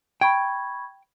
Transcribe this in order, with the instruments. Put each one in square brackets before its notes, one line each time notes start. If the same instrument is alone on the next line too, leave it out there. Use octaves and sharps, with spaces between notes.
[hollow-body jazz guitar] G5 [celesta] B5 C#6 G#6